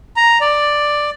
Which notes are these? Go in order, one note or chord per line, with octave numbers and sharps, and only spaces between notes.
A#5
D5